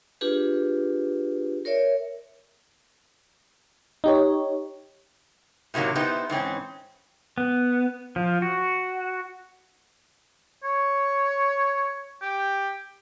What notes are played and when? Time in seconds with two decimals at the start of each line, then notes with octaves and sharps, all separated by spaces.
0.21 D4 F4 G4 G#4 B4
1.65 A#4 C#5 D5 E5
4.04 D#4 G4 C#5
5.74 A2 C3 D#3 F#3 A#3
5.95 B3 D#4 E4 G4 C5
6.30 G#2 E3 C4 C#4
7.38 B3
8.16 F3
8.42 F#4
10.64 C#5
12.22 G4